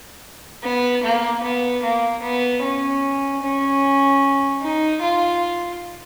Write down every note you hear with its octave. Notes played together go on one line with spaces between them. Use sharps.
B3
A#3
B3
A#3
B3
C#4
C#4
D#4
F4